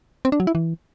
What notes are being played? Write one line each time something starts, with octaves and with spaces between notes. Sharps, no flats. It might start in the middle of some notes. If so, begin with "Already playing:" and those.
C4
D4
F#3
E4
E3